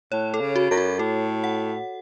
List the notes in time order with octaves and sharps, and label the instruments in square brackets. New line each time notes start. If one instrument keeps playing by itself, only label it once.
[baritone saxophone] A2 [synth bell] C#5
[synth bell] A4
[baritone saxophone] C#3
[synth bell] F#4
[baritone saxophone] F#2
[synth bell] F#4
[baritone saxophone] A2 [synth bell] A4
[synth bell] F#5